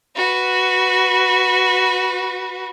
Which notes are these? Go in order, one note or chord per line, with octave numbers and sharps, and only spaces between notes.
F#4 B4